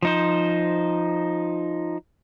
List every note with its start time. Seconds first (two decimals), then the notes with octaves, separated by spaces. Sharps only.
0.03 F3 D#4 C5